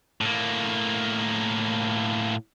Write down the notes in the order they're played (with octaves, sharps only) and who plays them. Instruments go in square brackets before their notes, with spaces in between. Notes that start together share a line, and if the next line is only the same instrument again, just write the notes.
[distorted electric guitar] A2 A#3